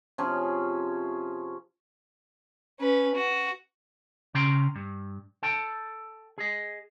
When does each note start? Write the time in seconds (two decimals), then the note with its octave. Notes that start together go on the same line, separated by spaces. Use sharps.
0.18 C3 F3 C#4 G#4
2.80 C#4 B4
3.15 F#4
4.34 C#3 C#4 G5 A#5 C6
4.75 G2
5.43 A4 G5 A5
6.38 G#4 D#5